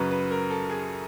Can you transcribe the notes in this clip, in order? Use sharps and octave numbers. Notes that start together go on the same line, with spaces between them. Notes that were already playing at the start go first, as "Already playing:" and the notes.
Already playing: F#2 C#3 F#3 B4
B4
A#4
A4
G#4